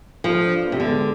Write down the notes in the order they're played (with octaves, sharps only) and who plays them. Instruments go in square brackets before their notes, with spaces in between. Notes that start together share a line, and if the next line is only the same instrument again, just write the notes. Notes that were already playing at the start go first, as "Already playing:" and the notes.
[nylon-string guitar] F3 [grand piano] A4
[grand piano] D4
B3
[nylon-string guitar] C3
D3
[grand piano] G#3